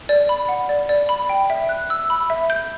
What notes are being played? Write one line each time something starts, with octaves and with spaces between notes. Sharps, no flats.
D5
B5
F#5
D5
D5
B5
G5
E5
F#6
E6
B5
E5
G6